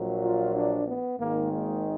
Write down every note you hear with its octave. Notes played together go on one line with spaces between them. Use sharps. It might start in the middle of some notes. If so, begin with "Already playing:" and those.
Already playing: A#1 A#2 F#3 A#3
F4
D4
B3
G#1 G#2 D#3 G#3 A#3
A#3